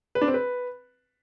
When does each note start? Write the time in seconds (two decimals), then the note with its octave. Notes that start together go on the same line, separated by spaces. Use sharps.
0.15 B4
0.22 D4
0.28 C4
0.34 B4